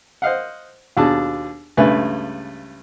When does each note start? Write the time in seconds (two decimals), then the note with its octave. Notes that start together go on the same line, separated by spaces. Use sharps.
0.22 C5 D#5 F5 F#5
0.97 D#2 B2 D4 G#4 A5
1.77 C#2 G2 A3 B4 G#5